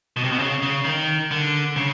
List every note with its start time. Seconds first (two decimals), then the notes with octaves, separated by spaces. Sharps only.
0.16 B2
0.24 C3
0.32 B2
0.39 C#3
0.62 C#3
0.85 D#3
1.31 D3
1.76 C#3